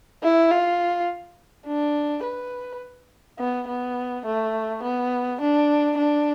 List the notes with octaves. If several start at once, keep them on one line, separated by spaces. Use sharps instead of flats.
E4
F4
D4
B4
B3
B3
A3
B3
D4
D4